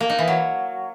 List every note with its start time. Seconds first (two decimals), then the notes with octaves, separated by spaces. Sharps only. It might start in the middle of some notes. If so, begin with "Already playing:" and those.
0.01 A#3
0.10 D#4
0.19 E3
0.28 F#3